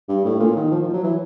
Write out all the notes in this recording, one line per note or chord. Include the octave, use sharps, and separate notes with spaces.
G2
A2
A#2
D#3
F3
F3
F#3
E3